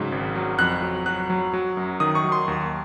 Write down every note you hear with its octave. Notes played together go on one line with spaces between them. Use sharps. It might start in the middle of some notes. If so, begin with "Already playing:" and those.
Already playing: G#2 C#3 F#3
G#1
F#3
F2 F#6
F#3
F#3 F#6
F#3
F#3
F#2
D#3 D#6
C#6
F#3
C6
D#2